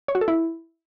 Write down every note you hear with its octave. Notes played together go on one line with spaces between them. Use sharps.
C#5
F#4
A4
E4